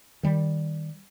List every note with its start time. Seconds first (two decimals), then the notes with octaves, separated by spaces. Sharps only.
0.23 D#3 G3